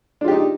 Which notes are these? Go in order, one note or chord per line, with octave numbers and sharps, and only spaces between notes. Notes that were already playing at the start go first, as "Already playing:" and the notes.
D4 D#4 F4 G4